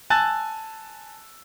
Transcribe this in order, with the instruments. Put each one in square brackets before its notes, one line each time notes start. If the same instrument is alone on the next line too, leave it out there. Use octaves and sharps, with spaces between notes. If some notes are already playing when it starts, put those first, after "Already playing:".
[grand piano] G#5 A5 E6 F#6 A6